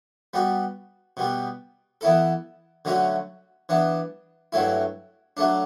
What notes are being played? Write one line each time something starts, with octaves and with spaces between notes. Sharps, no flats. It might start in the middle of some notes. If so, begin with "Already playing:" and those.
G3 B3 F#4
B2 G3 B3
E3 B3 E4 A4
D3 F#3 A3 C#4 F#4
E3 B3 D4
G2 F#3 A3 E4
F#3 A3 D4